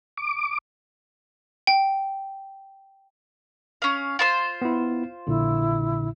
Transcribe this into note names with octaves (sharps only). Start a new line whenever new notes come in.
D6
G5
C#4 F5
F4 C5 C6
B3 E4
A#1 A#2 D3 E4